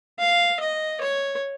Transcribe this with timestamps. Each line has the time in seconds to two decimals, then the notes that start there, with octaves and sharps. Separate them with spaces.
0.19 F5
0.60 D#5
1.01 C#5